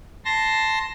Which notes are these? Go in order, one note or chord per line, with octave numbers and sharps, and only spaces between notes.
A5 C6 A#6